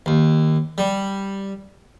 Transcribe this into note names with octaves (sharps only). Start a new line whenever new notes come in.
D#2
G3